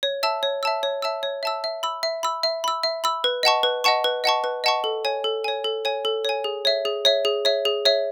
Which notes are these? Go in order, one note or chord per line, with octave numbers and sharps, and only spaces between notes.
C#5
E5 A5 E6
C#5
E5 A5 E6
C#5
E5 A5 E6
C#5
E5 A5 E6
E5
B5 E6
E5
B5 E6
E5
B5 E6
E5
B5 E6
B4
D#5 F#5 A5 C#6
B4
D#5 F#5 A5 C#6
B4
D#5 F#5 A5 C#6
B4
D#5 F#5 A5 C#6
A4
C#5 G#5
A4
C#5 G#5
A4
C#5 G#5
A4
C#5 G#5
G#4
C#5 E5
G#4
C#5 E5
G#4
C#5 E5
G#4
C#5 E5